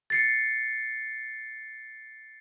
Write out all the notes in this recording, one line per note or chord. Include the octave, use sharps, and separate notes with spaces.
A6 C7 C#7